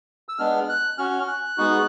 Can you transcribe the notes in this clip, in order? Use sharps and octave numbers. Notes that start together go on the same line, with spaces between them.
E6
G#3 B3 D4 F6
F#6
C#4 F#4 F6
F#6
G#3 B3 D#4 F#4